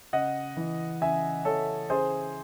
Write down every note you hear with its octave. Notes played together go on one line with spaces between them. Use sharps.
C#3 D#5 F#5
E3
C#3 E5 G#5
E3 A4 C#5
C#3 G#4 C5